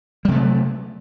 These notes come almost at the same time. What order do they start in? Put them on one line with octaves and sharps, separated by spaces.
G3 C3 A3 F#3